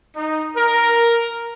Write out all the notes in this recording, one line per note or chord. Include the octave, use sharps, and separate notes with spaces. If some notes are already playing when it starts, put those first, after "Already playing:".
D#4
A#4